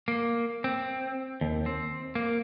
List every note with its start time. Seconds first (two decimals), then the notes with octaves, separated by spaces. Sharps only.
0.08 A#3
0.64 C4
1.41 D#2
1.66 C4
2.15 A#3